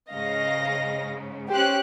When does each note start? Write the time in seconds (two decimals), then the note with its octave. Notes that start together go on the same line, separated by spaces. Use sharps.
0.11 G#2 C#3 D#5 F5 A#6
1.50 C#4 G4 C5 F#6